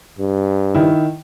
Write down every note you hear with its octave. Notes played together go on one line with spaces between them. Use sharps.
G2
D#3 E4